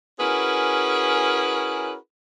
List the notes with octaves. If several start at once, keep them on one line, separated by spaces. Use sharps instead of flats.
C#4 E4 F#4 G#4 A#4 B4